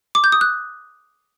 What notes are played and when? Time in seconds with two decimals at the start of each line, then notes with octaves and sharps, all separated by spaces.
0.15 D6
0.24 G6
0.32 D#6
0.41 F#6